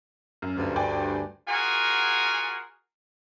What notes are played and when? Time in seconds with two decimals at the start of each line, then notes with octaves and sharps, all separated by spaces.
0.42 F#2
0.56 D2 G2
0.76 D5 G5 G#5
1.48 F4 F#4 G#4 A#4 F#5 G#5